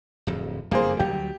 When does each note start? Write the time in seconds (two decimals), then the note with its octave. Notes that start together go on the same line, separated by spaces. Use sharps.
0.27 D1 F2
0.71 F#1 F2 G3 A#3 G#4 C5
0.99 D2 F#3 G3 G4